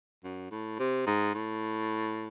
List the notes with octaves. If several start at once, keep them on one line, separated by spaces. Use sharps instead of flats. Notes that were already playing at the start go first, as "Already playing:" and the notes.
F#2
A2
C3
G#2
A2